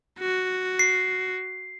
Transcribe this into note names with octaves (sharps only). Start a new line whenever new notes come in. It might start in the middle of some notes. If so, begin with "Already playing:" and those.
F#4
C7